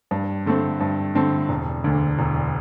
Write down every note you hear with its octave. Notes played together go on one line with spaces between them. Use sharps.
G2
D3 A3 C4
G2
D3 A3 C4
E1
D2 D3
E1